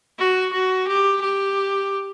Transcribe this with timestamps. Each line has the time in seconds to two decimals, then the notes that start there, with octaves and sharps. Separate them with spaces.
0.19 F#4
0.53 F#4
0.87 G4
1.21 G4